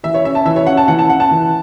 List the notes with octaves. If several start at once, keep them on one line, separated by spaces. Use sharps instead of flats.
E3 E5
C#5
C#4 E5
A5
E3 E5
C#5
C#4 F#5
A5
E3 F#5
A5
C#4 F#5
A5
E3